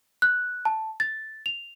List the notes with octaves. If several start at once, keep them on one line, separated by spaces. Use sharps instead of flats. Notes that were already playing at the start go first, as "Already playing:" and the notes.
F#6
A5
A6
F7